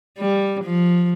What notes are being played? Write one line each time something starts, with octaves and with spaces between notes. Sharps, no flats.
G3
F3